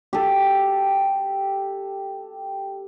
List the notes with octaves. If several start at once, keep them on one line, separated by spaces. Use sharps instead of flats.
G4 A4